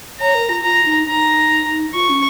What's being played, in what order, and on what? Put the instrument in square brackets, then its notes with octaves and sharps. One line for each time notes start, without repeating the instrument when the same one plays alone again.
[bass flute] C#5 [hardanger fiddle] A#5
[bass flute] A#4
F4
[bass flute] F4 [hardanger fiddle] A#5
[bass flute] D#4
[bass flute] D#4 [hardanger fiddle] A#5
[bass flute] F4 [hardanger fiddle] C#6
[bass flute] C#4